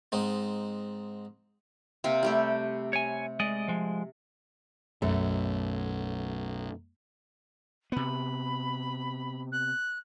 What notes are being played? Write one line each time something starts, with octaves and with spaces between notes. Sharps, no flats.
G#2 C4 D#4
C3 A#3 C4
G3 A3 G4
C#5 G#5
G#3 D5 D#5
F3 G#3
B1 F#2 A3
C3 B3 B5
F#6